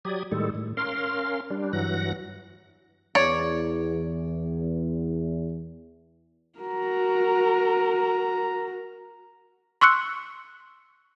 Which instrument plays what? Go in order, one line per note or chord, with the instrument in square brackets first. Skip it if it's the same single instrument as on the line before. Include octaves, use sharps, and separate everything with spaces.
[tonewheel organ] F#3 G4 D5 D#6 G#6
A2 D#3 G3 G#3 A4
A2
C#4 A#4 F5 C6
G3 D4
G2 E3 F#3 F#5 A#6
[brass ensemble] E2 [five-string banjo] C#5 D5
[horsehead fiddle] F#4 A#4 [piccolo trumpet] A#5
[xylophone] C6 C#6 E6 F#6 C#7